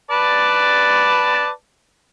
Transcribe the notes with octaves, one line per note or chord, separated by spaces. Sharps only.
B4 D5 A5